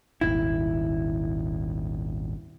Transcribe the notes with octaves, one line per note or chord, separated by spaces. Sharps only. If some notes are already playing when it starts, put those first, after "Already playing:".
D#1 G#1 D#2 E4